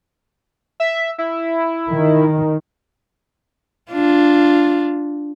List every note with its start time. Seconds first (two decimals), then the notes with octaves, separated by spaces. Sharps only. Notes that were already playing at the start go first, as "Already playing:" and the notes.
0.80 E5
1.18 E4
1.91 D#3
3.92 D4 F4